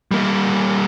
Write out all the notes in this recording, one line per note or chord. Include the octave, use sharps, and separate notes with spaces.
G3 A#3